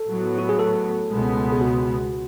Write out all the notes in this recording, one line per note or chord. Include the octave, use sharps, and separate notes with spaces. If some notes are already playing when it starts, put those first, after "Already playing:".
Already playing: A4
A2 F#3 B3
F#4
G#4
A4
C#2 B2 G#3 B3
G#4
F#4